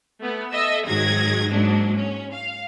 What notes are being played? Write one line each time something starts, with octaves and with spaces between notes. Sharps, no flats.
A3 B3
A4 D#5 E5 E6
G#2 D#3 F#3 G#4 G#6 A#6
G#2 F#3 G#3 A#3 D4
C#4
F5